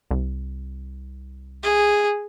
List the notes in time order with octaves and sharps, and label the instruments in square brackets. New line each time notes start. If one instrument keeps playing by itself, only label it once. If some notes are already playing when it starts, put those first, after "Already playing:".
[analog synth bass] C2
[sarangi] G#4